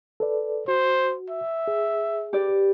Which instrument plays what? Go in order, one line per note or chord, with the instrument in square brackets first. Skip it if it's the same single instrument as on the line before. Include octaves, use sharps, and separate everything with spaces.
[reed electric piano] A4 B4 D5
[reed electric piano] F#4 [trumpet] C5
[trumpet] E5
[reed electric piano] G#4
[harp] G4 B4 D5